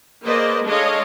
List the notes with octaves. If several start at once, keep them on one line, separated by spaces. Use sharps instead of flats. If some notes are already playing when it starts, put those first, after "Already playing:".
A#3 G#4 B4 C5 D5 D#5
G#3 D4 A4 C#5 D#5 F5